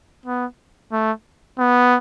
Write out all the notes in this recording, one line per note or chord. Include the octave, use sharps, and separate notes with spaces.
B3
A3
B3